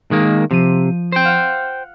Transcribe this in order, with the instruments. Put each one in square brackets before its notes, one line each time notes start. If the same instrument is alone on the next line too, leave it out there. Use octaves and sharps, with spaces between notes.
[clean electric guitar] D#3 G#3 A#3
[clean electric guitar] C3 [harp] F3 D#7
[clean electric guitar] C5 G5
[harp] F5 F#5